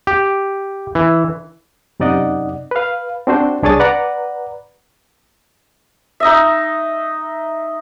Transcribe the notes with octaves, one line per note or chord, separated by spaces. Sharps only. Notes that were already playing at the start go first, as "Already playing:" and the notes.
G4
E3
F#2 C3 D#4 D5 D#5 F#5
B4 F5
C4 D4 F#4 C5
C2 D4 G#4 C#5 D#6 A6
B4 D5 F#5 A#5
D#4 D#5 E5